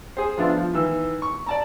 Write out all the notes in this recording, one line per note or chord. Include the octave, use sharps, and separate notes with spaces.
G#4 C5
F3 B3 D4 F4 E5 F5
F3
D#3 E3 E6
C#6
D5 A5 A#5